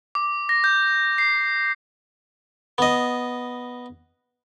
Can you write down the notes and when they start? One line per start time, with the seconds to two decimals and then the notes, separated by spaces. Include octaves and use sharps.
0.15 D6
0.49 A#6
0.64 G6
1.18 C7
2.78 B3 D#5